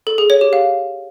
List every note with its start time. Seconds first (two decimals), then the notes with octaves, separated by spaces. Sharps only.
0.07 A4
0.18 G#4
0.30 C#5
0.41 G4
0.53 F5